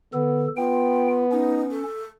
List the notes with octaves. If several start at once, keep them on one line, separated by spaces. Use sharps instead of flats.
D3 B3 A4
B3 F4 G5
C#4 D#4
A4